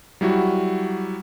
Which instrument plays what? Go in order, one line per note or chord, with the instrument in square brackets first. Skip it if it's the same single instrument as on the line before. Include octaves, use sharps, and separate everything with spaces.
[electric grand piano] F#3 G3 E4 F#4